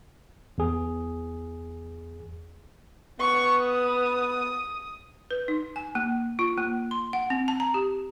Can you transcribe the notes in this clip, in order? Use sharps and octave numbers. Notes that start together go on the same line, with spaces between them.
E2 G#4
B3 C#6
D#6
B4
D#4
G#5
A#3
F4
A#3
C6
F#5
C4
A5
A#5
G4